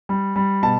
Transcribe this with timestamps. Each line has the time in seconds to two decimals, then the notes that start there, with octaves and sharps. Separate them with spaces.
0.09 G3
0.36 G3
0.63 B2 A5